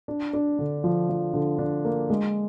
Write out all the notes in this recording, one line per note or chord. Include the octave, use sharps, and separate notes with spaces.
D4
D4
D3
F3
F3
D3
D4
A#3
G#3